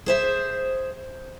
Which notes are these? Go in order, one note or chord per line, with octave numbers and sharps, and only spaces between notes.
G#4 C5 E5